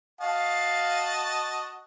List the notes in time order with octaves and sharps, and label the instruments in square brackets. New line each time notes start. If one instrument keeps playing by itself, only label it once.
[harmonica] F#4 D#5 A5 [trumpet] F5